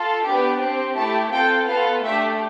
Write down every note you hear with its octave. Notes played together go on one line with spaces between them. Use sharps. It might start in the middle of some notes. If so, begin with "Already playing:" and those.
Already playing: F4 A4
B3 D4 G4
C4 G4
A3 E4 G4 A5
C4 F4 A4 G5
B3 F4 A4 F5
A3 D4 G4 E5